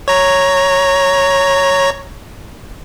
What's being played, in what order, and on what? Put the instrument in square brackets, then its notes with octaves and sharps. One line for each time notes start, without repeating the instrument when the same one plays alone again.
[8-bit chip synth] C#5 A#5